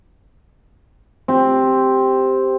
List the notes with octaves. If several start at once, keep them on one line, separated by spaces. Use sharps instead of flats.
C4 G4